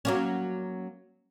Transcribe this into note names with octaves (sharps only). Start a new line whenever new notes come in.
F#3 A#3 C#4